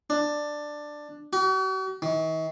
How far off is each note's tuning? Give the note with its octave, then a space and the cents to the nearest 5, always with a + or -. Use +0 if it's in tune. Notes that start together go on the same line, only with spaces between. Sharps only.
D4 +10
F#4 +45
D#3 +45